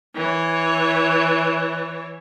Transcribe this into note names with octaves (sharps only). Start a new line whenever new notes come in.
E3 C#5